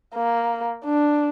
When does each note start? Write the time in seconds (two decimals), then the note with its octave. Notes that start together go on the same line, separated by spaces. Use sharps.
0.15 A#3
0.84 D4